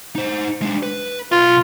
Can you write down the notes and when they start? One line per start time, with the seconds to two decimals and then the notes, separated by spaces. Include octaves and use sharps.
0.16 D#4 C5
0.62 G#3 D4
0.83 B4
1.32 B1 F4 C6